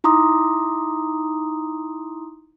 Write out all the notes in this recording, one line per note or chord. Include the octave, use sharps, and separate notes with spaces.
D#4 E4 A#5 C6 D6 D#6